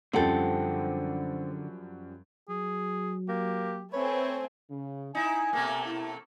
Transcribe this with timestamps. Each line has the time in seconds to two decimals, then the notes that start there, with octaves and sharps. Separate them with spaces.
0.13 F#2 D3 F3 G3 C4 A4 F#5 G5
2.49 F#3 G#4
3.29 A#3 G4
3.93 A3 C4 B4 C#5 G#5
4.70 C#3
5.15 D#4 E4 G#5
5.53 B2 A3 A#3
5.86 E4